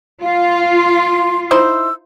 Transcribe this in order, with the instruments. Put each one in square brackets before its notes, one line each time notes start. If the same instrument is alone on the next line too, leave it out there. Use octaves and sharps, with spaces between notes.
[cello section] F4 [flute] F5
[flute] C6
[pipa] D#4 E4 C5 [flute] E6